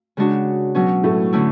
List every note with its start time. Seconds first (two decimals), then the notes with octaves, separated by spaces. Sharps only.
0.17 C#3 G#3 D4 F#4
0.75 B2 F#3 C#4
1.03 A2 A3
1.32 D3 A3 C#4 E4